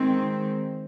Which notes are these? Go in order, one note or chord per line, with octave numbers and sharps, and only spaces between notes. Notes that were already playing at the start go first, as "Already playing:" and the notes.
Already playing: D#3 G#3 C4